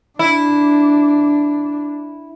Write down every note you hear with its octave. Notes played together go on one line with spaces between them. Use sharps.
D4 E4